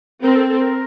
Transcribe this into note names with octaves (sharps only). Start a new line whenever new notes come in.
C4 A#4
A4
A4
A#4